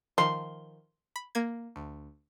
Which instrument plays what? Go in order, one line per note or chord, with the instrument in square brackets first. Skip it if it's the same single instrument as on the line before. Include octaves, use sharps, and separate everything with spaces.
[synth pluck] D#3 F3 [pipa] C6
[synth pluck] B5
A#3 G#6
D2